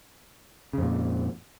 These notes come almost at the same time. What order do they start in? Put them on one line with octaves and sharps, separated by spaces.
C#3 F2 A#2